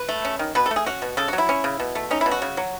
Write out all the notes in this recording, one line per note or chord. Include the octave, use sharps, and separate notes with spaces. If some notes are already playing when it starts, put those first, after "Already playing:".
Already playing: B4
A3
C#4
D#3
B2 B4
A4
A3
G#4
C#4 F#4
B2
C#3 A4
F#4
F#3
E4
C#4
C#3
B2
A3
C#4 D#4
E4
B2
F#4
C#3
F#3